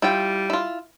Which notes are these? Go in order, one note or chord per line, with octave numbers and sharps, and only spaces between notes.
G3 E4 F4 G5
E4 F4